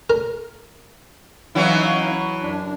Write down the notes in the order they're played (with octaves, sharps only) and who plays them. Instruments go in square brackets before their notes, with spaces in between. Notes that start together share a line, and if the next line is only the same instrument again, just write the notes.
[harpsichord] A#4
[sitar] E3 F#3 E4 [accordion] C#4 D#4 F5
[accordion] F#2 D4